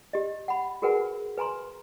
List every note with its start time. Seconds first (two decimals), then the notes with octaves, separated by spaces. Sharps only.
0.13 G4 D#5
0.48 F#5 B5
0.82 F#4 G#4 A#4 B4 F#5 G#5
1.38 B4 G#5 A#5 C6